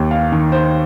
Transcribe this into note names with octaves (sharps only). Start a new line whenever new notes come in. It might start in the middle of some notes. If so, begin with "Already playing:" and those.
Already playing: D#2
F5
D#3
C5